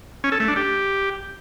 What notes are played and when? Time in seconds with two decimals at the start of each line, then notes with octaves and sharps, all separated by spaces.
0.24 C#4
0.32 A4
0.40 A3
0.48 D4
0.56 G4